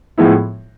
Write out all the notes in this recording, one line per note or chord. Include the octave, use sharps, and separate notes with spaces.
A2 F3 G#3 B3 E4